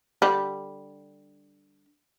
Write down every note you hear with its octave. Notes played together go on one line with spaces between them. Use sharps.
D3 G3